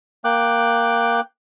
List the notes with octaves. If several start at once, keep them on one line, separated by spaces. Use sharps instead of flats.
A#3 G5 D6 F#6